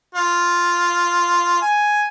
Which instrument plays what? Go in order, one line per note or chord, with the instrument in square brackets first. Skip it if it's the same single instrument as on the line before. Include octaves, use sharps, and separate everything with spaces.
[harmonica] F4
G#5